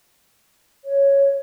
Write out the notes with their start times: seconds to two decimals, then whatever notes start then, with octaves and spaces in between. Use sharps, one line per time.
0.84 C#5